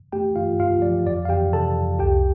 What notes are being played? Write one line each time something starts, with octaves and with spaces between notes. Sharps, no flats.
A3 G4 G5
G2 F4 F5
G2 F4 F5
F3 D5
F2 D5
F5
F2 G4 G5
C3 A4 A5
F2
C2 G4 G5